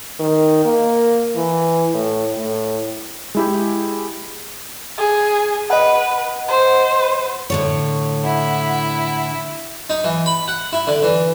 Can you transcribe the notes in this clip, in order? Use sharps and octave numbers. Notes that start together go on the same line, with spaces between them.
D#3
A#3
E3
A2
A2
G#3 E4 G4
G#4
B4 D#5 F#5
C5
A2 D3 C#5
E4 F#5
D#4
E3
B5
F#5
E4
D3
E3